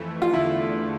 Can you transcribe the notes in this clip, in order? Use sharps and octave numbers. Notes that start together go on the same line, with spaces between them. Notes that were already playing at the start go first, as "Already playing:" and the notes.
Already playing: F2 E3 A3
F4
E2 D3 A3 E4